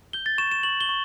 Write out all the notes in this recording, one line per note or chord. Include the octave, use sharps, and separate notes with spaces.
G6 G7
A6
C#6 E7
E7
C#6 F#7
G7
C#6